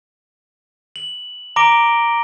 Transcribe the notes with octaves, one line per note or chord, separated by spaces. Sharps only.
F#7
A#5 D6 A#6 D7 G7